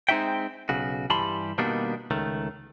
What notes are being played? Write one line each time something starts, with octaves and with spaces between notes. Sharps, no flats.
G#3 C4 D#4 F#4 E5 G5
B1 C#3 F#4
G2 E3 G3 A5 B5 C6
B2 D#3 G3 A#3 B3 D4
C#2 D#3 A3